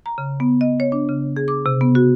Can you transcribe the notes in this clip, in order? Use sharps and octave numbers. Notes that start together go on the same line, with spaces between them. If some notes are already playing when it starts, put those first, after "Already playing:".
A#5
C#3
B3
D#5
C#5
D4
C#3
G#4
D6
C3
B3
F#4